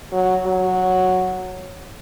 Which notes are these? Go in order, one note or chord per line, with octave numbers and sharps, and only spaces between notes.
F#3
F#3